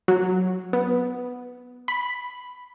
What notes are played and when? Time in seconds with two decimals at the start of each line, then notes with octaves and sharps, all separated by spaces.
0.08 F#3
0.73 B3
1.88 B5